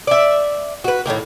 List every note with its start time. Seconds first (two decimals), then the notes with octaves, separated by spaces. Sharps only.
0.07 D5 E5
0.84 F#4 B4
1.06 A2 C3 D#3 A#3